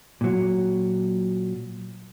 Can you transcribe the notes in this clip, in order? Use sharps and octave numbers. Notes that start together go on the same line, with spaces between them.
A#2 F#3